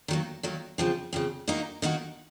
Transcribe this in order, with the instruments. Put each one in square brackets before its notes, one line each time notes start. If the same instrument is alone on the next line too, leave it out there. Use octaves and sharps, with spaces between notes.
[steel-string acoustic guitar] D#3 F#3 A#3
D#3 F#3 A#3
C#3 F3 C4
C#3 F3 C4
D#3 A#3 D#4 F#4
D#3 A#3 D#4 F#4